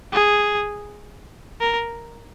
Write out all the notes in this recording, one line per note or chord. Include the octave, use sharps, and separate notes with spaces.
G#4
A#4